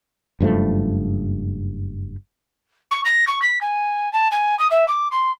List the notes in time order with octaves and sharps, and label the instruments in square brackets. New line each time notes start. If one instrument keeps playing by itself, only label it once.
[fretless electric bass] F#1 G2 F3 A3
[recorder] C#6
A#6
C#6
B6
G#5
A5
G#5
D#6
E5
D6
C6